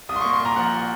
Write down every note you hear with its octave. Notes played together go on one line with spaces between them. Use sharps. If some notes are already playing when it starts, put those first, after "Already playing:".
C2 D#6
C6
A#3 C#6
C6
A#2 A#5
F3 F#5